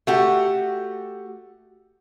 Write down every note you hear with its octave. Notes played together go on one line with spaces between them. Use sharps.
A3 F#4 G4